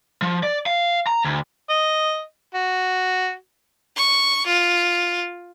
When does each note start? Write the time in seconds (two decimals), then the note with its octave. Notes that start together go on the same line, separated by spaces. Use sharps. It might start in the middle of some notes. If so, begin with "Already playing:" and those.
0.22 F3
0.43 D5
0.66 F5
1.07 A#5
1.24 D2
1.70 D#5
2.55 F#4
3.97 C#6
4.47 F4